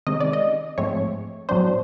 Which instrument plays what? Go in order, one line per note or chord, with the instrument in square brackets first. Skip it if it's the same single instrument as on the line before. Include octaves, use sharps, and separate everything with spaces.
[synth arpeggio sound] C3 D#3 G#3 C#4 D#5
D5
D#5
G#2 F3 A3 C4 C#5
A2 F#3 B3 D4 C5